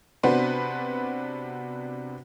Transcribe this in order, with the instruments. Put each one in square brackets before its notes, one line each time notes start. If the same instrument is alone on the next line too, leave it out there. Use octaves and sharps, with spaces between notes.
[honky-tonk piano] C3 B3 D4 F#4 B4 C5